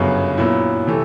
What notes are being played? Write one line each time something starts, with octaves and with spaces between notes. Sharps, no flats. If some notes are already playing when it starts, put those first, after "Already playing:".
Already playing: G1 F#2 C#3 F#3 B3
A#2 F#3 B3 E4
C3 E3 A3